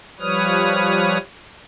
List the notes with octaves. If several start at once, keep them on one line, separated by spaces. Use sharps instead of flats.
F3 G3 B4 C#5 D#6 F6